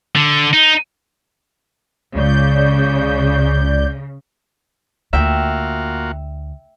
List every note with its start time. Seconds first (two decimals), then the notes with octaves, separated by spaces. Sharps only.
0.16 D3
0.53 D#4
2.15 C#2 C#3 D5 G6
5.13 D2 A#3 F4 F#4 E5 G5